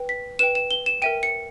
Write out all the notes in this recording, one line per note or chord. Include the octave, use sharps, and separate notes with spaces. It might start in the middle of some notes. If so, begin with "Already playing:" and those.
Already playing: B4 G5
B6
B4 G5 E7
E7
G7
E7
A#4 E5 G5 D#7
C#7